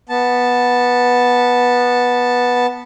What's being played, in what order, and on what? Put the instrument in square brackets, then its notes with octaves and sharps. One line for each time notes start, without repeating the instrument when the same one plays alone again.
[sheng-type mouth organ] B3 A5